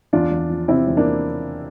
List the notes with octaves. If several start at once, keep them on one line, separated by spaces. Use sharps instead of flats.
E2 D4 F4
E2
F3
C3 C4 E4
E2
A#3 D4